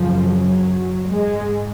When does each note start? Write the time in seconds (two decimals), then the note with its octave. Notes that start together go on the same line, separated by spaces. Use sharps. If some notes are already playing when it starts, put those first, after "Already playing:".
Already playing: F#2 C#3 F3
0.36 F#3
1.09 G#2 G#3